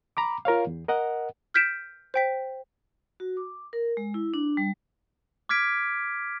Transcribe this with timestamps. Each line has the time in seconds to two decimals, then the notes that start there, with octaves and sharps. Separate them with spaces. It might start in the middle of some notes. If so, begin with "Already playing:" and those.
0.17 A#5 B5 D6
0.45 F4 A#4 C#5 F5
0.67 E2
0.88 A#4 D#5 F#5
1.54 F6 G6 B6 D7 E7
2.14 C5 G5 B6
3.20 F#4
3.37 D6
3.73 A#4
3.97 G#3
4.14 E4
4.34 D4
4.57 G3
5.49 D6 F6 G#6 B6 D7